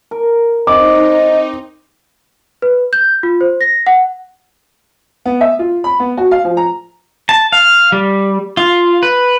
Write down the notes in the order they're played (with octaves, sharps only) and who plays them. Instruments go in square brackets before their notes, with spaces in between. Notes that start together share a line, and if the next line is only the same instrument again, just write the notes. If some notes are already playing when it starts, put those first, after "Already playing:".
[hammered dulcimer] A#4
[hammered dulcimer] C4 [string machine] D#4 [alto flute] D#5 [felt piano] D6
[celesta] B4
G6
F4
C5
A#6
F#5
[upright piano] B3
E5
F4
B5
B3
F#4
F5
F3
A#5
[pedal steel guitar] A5
F5
G3
F4
B4